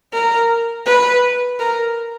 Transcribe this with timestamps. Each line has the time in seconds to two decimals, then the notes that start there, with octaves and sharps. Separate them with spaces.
0.13 A#4
0.86 B4
1.59 A#4